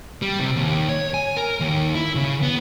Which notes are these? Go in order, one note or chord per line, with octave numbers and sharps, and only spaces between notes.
G3
C3
D#2
C#5
G#5
A#4
D#2
E4
C#3
B3